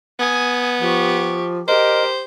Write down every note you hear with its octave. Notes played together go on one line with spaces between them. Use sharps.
B3 G#5 D#6
F3 G4 C#6
G4 A#4 C5 D#5